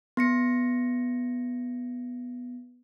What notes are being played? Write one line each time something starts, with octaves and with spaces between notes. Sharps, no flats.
B3 A#6 C#7